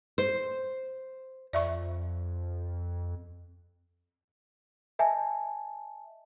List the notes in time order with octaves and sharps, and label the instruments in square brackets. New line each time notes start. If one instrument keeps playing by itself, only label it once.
[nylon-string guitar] C5
[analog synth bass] F2 [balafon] D5 E5 C#6
[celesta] D#5 E5 G#5 A5